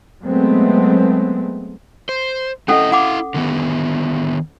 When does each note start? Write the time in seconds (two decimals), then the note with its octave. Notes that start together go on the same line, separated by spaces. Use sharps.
0.23 F#3 G#3 A3 B3 C4
2.09 C5
2.68 A3 C#4 E4 A4 D#5 F#5
2.92 E4 F5 F#5 D6
3.34 D3 D#3 B3